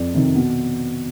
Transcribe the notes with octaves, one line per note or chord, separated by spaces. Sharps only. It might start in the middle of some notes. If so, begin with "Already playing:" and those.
Already playing: F2 D5
C3 D#3
B2